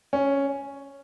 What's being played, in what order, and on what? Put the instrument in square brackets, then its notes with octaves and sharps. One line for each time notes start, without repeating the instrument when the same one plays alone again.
[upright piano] C#4